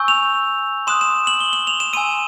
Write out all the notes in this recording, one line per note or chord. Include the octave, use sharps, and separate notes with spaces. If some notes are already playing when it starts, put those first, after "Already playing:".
Already playing: G#5 C#6 E6 G6
F7
C6 D#6 F#6 E7
E7
F#7
G7
F#7
F7
E7
G#5 C6 E6 D#7